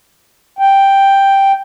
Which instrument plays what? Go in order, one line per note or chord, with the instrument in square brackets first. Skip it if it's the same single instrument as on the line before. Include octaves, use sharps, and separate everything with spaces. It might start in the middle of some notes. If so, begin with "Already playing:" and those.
[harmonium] G5